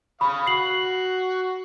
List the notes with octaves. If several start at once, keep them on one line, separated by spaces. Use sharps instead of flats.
F5 B5 C#6 D#6
F#4 C7 F#7